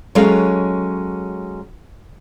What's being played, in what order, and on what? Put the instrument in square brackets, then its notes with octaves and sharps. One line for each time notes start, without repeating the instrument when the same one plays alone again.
[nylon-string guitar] F#3 G#3 C#4 A4 F5